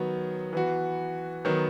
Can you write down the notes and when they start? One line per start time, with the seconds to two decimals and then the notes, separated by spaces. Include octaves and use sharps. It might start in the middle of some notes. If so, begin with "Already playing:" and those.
Already playing: D#3 F#3 B3
0.53 E3 B3 F#4
1.45 D#3 F#3 B3